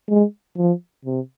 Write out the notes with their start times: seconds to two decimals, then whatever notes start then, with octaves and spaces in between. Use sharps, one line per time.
0.09 G#3
0.57 F3
1.05 C3